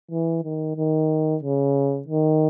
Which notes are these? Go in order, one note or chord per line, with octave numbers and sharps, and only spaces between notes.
E3
D#3
D#3
C#3
D#3